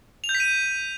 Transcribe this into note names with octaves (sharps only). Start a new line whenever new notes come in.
F7
G6
B6
D#7